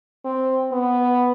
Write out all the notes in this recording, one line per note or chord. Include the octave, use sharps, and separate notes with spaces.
C4
B3